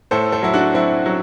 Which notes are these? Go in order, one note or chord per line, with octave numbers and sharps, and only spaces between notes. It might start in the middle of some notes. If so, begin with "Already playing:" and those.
A2 A4 C5
A4 C5
F#3 E4
D4 F#4
F#3 C4 E4
F#3